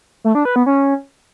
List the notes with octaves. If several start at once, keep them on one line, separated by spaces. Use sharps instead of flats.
A3
D4
B4
B3
C#4